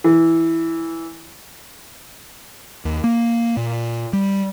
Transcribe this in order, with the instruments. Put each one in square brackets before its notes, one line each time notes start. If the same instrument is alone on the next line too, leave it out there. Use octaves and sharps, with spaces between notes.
[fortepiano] E3
[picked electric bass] D#2
A#3
A#2
G3